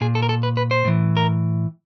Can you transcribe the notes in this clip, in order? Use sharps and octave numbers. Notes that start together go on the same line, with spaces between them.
A#2 G#4
A4
A#4
A4
B4
B4
C5
A2 E3
A#4